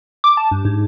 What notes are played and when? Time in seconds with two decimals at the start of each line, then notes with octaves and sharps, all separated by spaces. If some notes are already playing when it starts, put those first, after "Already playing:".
0.24 D6
0.37 A5
0.51 G2
0.65 G#2